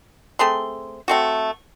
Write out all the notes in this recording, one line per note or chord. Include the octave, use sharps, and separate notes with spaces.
A3 C4 G#4 C6
A3 C4 F#4